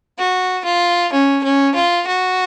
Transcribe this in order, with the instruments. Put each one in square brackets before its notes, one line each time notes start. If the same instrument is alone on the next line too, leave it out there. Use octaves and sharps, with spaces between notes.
[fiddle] F#4
F4
C#4
C#4
F4
F#4